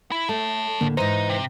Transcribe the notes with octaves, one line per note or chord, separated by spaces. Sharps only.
E4
A3 C#5 A5
A2 D3 A#3
G#2 E3 D#4 C5
C3